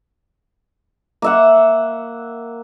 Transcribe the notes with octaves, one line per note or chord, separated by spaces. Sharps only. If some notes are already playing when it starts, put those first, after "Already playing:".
A#3 E5 F#5